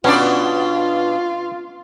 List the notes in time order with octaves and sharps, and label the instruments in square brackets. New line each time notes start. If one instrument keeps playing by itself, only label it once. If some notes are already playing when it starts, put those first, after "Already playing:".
[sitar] B2 D4 D5 [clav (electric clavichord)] B3 [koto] C#4 [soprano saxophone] F4